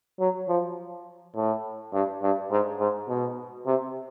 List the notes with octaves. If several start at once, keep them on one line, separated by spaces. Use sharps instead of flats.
F#3
F3
A2
G2
G2
G#2
G#2
B2
C3